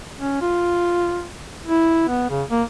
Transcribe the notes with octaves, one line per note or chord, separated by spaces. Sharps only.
C#4
F4
E4
B3
C#3
A#3